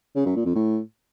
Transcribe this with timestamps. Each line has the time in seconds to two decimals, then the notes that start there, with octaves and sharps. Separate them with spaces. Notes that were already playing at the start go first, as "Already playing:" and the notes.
0.16 C#3
0.26 F#2
0.36 A#2
0.45 F2
0.55 A2